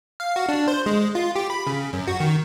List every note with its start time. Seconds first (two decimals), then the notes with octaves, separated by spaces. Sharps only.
0.20 F5
0.36 F#4
0.48 D4
0.68 C5
0.86 G#3
1.15 F4
1.36 G4
1.50 B5
1.67 C#3
1.93 F#2
2.08 F#4
2.20 D#3